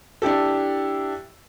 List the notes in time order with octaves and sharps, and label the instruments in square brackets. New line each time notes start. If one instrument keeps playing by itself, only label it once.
[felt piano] D4 E4 G4 A4